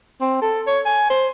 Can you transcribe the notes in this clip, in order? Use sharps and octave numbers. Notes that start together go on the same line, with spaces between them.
C4
A4
C#5
G#5
C5